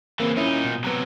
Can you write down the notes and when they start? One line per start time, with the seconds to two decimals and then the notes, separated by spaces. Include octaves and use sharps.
0.20 C#3 E3 A#3 C4
0.37 A#2 C#4 D#4 E4
0.65 B2
0.84 C3 F#3 B3 A#5